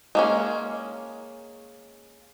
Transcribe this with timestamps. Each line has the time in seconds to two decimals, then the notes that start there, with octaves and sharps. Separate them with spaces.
0.15 G#3 A#3 C#4